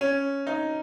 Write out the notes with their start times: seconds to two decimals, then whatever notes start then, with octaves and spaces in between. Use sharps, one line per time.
0.01 C#4
0.47 D#4